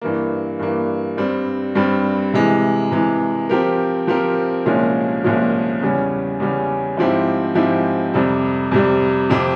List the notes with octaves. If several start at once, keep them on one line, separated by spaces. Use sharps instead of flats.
G2 E3 A#3
G2 E3 A#3
G2 G3 C4
G2 G3 C4
C3 E3 G#3
C3 E3 G#3
F3 C4 G4 A#4
F3 C4 G4 A#4
C2 A#2 F3 G#3 C#4
C2 A#2 F3 G#3 C#4
E2 C#3 G3 C#4
E2 C#3 G3 C#4
G#2 F3 C4 E4 G4
G#2 F3 C4 E4 G4
F2 C3 G3
F2 C3 G3
F2 C3 F3 C4 G4